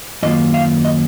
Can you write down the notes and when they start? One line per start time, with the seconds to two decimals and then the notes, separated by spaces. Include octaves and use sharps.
0.23 F#2 D#3 A#3 F4 D#5
0.54 F5
0.85 D#5